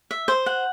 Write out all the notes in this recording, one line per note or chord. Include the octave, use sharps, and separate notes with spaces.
E5
C5
F#5